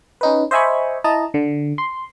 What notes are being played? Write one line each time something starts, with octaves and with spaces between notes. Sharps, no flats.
C#4 D#4 B4
C5 D#5 E5 G#5 B5 C#6
E4 D#5 A5 A#5
D3
C6